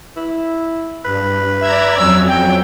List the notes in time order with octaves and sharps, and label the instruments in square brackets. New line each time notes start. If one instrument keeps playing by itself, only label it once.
[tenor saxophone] E4
[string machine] G2 [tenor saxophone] B4
[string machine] D5 A#5 G#6 [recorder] E5
[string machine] F2 F#3 [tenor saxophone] C#4 [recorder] E6
[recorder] G5